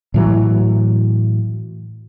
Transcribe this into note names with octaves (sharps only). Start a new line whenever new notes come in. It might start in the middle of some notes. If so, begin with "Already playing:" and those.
A2 E3 F#3